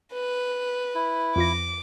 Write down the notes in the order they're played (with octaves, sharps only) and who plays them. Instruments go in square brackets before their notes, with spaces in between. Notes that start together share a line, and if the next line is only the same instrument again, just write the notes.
[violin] B4
[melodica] E4
[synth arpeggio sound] F2 F4 A#6 [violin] D6